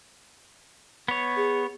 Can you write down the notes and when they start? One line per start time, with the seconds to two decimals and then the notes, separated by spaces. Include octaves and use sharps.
1.08 B3 C#5
1.36 G#4